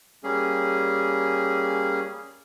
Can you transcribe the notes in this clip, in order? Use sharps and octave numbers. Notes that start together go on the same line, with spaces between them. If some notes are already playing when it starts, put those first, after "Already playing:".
G3 A#3 C#4 G#4